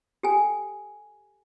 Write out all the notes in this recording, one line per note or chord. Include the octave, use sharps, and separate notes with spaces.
G4 A4 G5 G#5